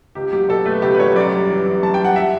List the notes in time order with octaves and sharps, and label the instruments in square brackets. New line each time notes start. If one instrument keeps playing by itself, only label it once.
[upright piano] C#2 G4
F#3 G4
B2 A4
A3 B4
C#2 G4
B4
F#3 C#5
F#2 D5
G3
E3
F#2
F#2 A5
G3 G5
F#5
E5